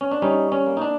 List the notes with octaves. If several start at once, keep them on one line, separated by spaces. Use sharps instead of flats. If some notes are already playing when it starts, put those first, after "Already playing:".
C#4
D4
G3 C#4 D#4
C#4
A#3
D#4
D4